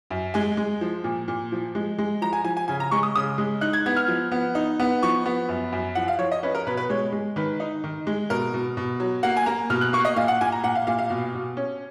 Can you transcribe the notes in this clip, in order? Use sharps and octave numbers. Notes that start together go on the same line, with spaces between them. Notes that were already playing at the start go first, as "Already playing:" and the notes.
F#2
G#3 G#5
G#3
F3
A#2
A#2
F3
G#3
G#3
F3 A#5
G#5
F3 G#5
G#5
C#3 G#5
A#5
G#3 C#6
D#6
C#3 D#6
G#3
D#4 F#6
G#6
B3 G#6
F6
F3
B3
D#4
B3
F3 C#6
B3
F#2
F#2
F3 F#5
F5
F3 C#5
D#5
C#4 B4
A#4
B2 B4
B4
G#3 C#5
G#3
D#3 B4
D#4
D#3
G#3
B2 A#4
B2
B2
F#3
A#3 F#5
G#5
A#3 A#5
B2 F6
F#6
A#3 C#6
D#5
A#2 F5
F#5
A#2 G#5
A#5
A#2 F#5
F5
A#2 F5
F5
B2
B2
C#4